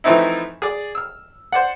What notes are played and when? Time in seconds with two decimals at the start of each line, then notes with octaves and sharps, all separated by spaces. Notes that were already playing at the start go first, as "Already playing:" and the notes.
0.04 E3 F3 A3 C4 D#4 E4
0.62 G#4 D5
0.95 E6 F6
1.52 C5 D5 F#5